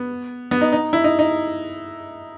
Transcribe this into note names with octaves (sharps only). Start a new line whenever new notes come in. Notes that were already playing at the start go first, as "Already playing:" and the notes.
Already playing: B3
B3
D#4
D#4
E4
D#4
D#4